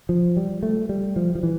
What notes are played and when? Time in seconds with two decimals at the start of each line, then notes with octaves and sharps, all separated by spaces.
0.09 F3
0.37 G3
0.63 A3
0.89 G3
1.16 F3
1.35 F3
1.43 E3